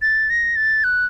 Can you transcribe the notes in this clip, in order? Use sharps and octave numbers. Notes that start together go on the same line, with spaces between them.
A6
A#6
A6
F#6